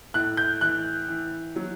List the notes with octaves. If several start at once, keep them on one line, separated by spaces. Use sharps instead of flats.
A2 F#6
G6
E3 F#6
E3
F#3